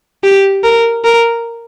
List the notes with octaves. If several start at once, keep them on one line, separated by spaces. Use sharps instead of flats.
G4
A#4
A#4